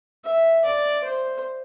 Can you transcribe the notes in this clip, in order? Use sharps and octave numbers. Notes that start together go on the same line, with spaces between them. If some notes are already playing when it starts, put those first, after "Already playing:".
E5
D5
C5